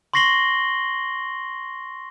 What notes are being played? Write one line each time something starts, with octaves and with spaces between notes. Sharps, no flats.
C6 C#6 A#6 C7 F#7 G7